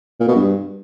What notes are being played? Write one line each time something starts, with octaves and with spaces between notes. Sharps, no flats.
A#2
B2
G2